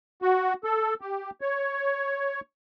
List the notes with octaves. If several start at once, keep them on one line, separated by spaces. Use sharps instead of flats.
F#4
A4
G4
C#5